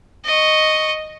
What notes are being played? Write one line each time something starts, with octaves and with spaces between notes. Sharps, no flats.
D#5 C#6